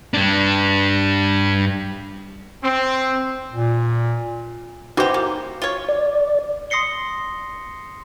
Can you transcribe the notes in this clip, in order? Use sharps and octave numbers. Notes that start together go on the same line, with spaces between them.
G2 D4
C4
A#2
E3 F#4 G4 C5 D6
A#3
F4 C#5
D5
C6 D#6 A#6 C7 C#7 G7